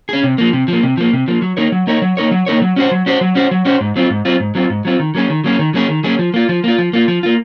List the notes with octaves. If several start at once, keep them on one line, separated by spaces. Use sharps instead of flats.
C#4 G#4
C3
F3 A#3
C3
F3 A#3
C3
F3 A#3
C3
F3 A#3
F#3
A#3 D#4 A#4 C#5
F#3
A#3 D#4 A#4 C#5
F#3
A#3 D#4 A#4 C#5
F#3
A#3 D#4 A#4 C#5
F#3
C#4 F#4 C5
F#3
C#4 F#4 C5
F#3
C#4 F#4 C5
F#3
C#4 F#4 C5
G#2
F#3 C4 F4
G#2
F#3 C4 F4
G#2
F#3 C4 F4
G#2
F#3 C4 F4
D#3
F#3 A#3 C#4 G#4
D#3
F#3 A#3 C#4 G#4
D#3
F#3 A#3 C#4 G#4
D#3
F#3 A#3 C#4 G#4
F3
A#3 F4
F3
A#3 F4
F3
A#3 F4
F3
A#3 F4